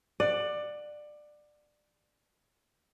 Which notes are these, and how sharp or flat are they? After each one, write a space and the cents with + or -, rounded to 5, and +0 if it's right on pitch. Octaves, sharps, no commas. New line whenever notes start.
D5 +20 F#5 +0